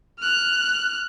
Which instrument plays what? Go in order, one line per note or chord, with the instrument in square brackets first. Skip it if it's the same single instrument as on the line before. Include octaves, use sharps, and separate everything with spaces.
[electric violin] F6 F#6